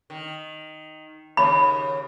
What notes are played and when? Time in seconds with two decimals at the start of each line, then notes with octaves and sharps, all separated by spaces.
0.10 D#3
1.37 D#2 C#3 B5